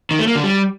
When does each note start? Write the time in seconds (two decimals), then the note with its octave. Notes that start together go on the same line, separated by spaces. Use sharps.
0.11 D#3
0.19 A3
0.27 A#3
0.35 D3
0.43 G3